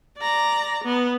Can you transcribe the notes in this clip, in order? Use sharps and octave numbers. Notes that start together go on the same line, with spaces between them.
D5 A#5
B3